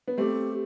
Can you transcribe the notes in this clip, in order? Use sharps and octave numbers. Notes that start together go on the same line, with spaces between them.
B3
A3 C4 G4